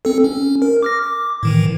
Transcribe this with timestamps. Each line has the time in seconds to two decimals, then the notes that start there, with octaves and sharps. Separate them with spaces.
0.05 C4 A4
0.24 C#4
0.62 A#4
0.83 D6 F6 A#6
1.02 D6
1.43 A2 D#3 E3